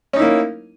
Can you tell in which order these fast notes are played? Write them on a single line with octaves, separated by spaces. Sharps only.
C#4 D#4 E4 A#3